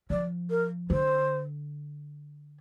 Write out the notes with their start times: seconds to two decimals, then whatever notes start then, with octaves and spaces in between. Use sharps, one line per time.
0.10 F3 D5
0.50 A#4
0.90 D3 C5